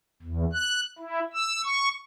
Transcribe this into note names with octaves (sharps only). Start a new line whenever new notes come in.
E2
F#6
E4
E6
C#6